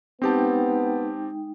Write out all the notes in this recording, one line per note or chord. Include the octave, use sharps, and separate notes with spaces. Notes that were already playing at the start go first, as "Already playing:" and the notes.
G#3 B3 C4 D#4 G4 G5 A5